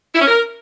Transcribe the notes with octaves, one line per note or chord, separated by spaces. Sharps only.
E4
C#4
A#4